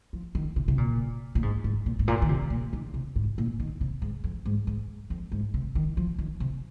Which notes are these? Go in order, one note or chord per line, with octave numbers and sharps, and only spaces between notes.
F3
D#3
C3
C3
A#2
A#2
G#2
G#2
A#2
G#2
A#2
D#3
C3
A#2
D#3
C3
G#2
A#2
D#3
C3
G#2
F2
G#2
G#2
F2
G#2
C3
D#3
F3
D#3
C3